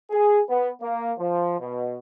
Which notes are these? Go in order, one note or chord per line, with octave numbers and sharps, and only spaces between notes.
G#4
B3
A#3
F3
B2